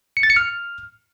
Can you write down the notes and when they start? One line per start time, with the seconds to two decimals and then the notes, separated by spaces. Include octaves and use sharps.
0.17 C#7
0.23 A6
0.30 C#7
0.36 F6